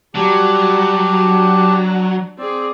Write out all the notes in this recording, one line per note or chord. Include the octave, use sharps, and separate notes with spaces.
F#3 G3 G4 A5
D4
C4 G#4 D5